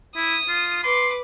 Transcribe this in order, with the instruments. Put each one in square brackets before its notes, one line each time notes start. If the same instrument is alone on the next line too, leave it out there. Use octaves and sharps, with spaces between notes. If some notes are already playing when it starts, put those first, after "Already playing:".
[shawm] E4 [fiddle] D#6
[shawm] F4
[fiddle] B4 D6 [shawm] C6